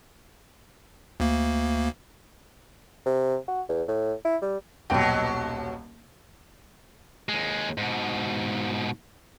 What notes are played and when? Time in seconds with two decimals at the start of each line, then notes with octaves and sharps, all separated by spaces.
1.20 D2 A#3
3.06 C3
3.48 F#4
3.69 E2
3.88 A2
4.25 E4
4.42 G3
4.90 D#1 B1 B2 F#3 G5
7.29 D#2 G#3
7.78 G#2 B2